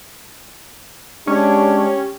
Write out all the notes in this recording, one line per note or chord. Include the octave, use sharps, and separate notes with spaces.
G#3 C#4 D4 G4